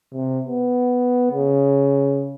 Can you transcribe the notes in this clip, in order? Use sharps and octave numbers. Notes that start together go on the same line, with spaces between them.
C3
B3
C#3